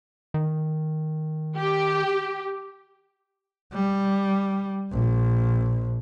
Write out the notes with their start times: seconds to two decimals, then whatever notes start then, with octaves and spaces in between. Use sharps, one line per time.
0.34 D#3
1.57 G4
3.73 G3
4.93 A#1